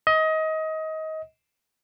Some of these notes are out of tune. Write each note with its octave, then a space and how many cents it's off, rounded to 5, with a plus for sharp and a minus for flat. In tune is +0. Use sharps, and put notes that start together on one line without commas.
D#5 +25